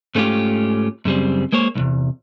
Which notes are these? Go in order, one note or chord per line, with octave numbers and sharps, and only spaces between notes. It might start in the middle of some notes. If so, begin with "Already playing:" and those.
G#2 A3 B3 C#4 F4 G4
F#2 C#3 G3 C4
G#3 A#3 C5 C#5
B1 E2 C3